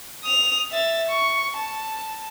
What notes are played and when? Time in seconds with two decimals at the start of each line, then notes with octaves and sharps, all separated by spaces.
0.24 D#6 F7
0.72 E5 A6
1.09 C#6
1.56 A5